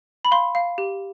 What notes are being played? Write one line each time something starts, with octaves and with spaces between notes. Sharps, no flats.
B5
F5 C6
F5
G4